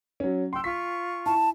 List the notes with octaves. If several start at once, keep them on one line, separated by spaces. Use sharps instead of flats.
F#3 C#4
G5 C6 E6
F4 C#6 B6
E4 A5